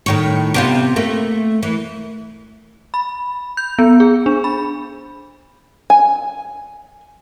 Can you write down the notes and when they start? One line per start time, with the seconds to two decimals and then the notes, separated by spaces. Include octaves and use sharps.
0.06 A2 D#3 C#5
0.54 C3 B3 F4
0.96 A3 A#3
1.63 E3
2.94 B5
3.57 G6
3.79 B3
4.00 G#4
4.26 D4
4.44 B5
5.90 G#5